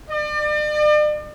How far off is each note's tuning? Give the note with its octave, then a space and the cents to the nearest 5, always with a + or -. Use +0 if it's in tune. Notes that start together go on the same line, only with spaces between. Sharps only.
D5 +40